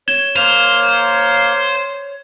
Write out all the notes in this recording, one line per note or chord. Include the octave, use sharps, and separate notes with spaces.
C#5 G#6 E7 G7
A#3 A#4 C5 F7